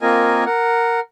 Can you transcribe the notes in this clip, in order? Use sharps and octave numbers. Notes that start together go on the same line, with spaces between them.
A#3 C4 F4 A#4 D#5 G#5
A#4 F#5